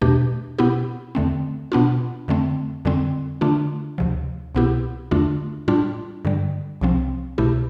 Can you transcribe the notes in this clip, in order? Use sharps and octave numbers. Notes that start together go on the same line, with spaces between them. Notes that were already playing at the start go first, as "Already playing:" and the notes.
E2 B2 A3 D4 G4
B2 B3 E4 G4
E2 D3 A3 C4
B2 B3 D4 F4
F2 D3 A3 C4
F2 D3 G3 C4
D3 A3 D4 F4
D2 C3 F3
C2 B2 B3 E4 G4
E2 D3 A3 D4 F4
A2 G3 D4 F4
G2 D3 G3
C2 C3 F3 C4
C2 B2 A3 E4 G4